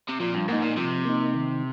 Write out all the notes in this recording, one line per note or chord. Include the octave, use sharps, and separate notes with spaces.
C3
A#2 F3
G2
G#2 A#3 D#4
A#2
C3 F3
A#3 D#4
D#3